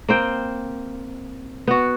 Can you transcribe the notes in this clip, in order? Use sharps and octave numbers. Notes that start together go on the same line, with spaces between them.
A#3 C4 G5
B3 F#4